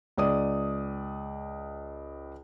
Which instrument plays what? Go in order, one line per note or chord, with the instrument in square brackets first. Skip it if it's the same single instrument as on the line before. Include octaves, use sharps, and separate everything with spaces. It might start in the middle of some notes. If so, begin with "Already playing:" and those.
[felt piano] C#2 D5 D#6